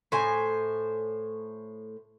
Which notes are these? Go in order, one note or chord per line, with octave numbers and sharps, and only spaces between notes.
A2 C5 G#5